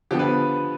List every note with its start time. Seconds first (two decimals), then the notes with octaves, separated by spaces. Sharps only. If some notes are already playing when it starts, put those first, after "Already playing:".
0.11 D3 F3 B3 G4
0.19 B4